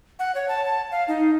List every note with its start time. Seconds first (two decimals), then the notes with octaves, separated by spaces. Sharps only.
0.19 F#5
0.35 C#5
0.48 A5
0.65 A5
0.91 F5
1.08 D#4